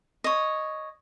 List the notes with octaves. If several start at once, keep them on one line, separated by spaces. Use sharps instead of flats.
C#5 D#5